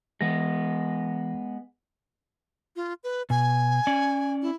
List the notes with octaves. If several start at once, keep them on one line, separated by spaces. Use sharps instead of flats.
E3 G#3 B3 A#6
F4
B4
B2 G#5
C#4 D5
E4